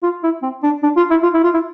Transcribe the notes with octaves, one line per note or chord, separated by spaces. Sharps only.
F4
E4
C4
D4
D4
F4
E4
F4
E4
F4
E4